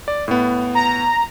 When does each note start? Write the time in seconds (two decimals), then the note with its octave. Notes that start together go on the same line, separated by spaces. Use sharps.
0.08 D5
0.28 A2 B3
0.75 A#5